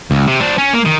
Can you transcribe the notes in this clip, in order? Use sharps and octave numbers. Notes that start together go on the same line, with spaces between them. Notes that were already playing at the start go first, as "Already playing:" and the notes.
C#2
C3
D4 C5
C#4
A#3
D#3